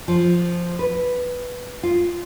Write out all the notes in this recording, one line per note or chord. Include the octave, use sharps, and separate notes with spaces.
F3
B4
F4